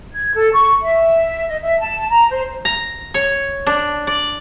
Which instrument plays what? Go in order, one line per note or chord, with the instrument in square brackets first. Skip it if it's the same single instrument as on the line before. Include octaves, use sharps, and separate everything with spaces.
[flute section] G#6
A4
C#6
E5
D#5
E5
A5
A#5
C5
[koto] A#5
C#5
D4
D5